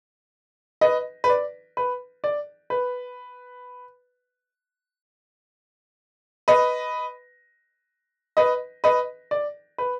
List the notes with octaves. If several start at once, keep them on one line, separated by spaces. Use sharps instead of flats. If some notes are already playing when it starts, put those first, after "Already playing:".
B4 D#5
B4
D5
B4
D5
B4
B4 D#5
B4 D#5
B4 D#5
D5
B4